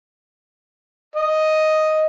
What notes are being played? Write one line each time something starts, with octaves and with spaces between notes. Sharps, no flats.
D#5